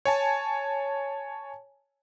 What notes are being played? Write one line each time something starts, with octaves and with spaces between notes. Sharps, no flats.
C#5 G#5 A5